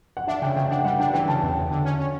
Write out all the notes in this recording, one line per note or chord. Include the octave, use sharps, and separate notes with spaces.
F#5
D4 E5
C#3 G5
C#3 G5
D4 F#5
G3 F#5
D4 G5
E3 G5
C#3 A5
E2
E2
D3
C#4
C#4